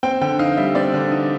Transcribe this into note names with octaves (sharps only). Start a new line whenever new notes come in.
C4 G5
D3 G5
D#4 F5
G3 E5
C4 D5
D3
D#4